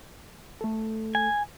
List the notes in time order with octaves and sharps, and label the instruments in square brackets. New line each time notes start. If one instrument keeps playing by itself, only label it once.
[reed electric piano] A3 A4
[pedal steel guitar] G#5